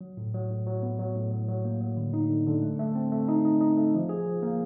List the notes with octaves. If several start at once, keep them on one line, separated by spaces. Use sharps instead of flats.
F#3
A2
F#3
A2
F#3
B3
F#3
A2
F#3
F#3
A#3
F#3
D3
D#4
D3
D3
A3
A3
C4
A3
D#4
D#4
D#4
A3
F3
G#4
F3
A#3